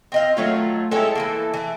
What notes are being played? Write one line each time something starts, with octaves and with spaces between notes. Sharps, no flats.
C4 D#5 F5
D#3 F#3 A3 F4 C#5 F5
G#3 E4 G4 A4 C#5
E3 G#3 A#3
E3 A3